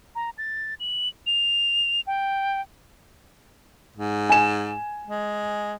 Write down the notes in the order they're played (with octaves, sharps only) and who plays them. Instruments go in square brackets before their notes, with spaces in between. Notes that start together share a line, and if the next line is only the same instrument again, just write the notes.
[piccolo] A#5
A6
F#7
F7
G5
[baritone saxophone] G#2
[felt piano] G#5 E7
[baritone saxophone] G#3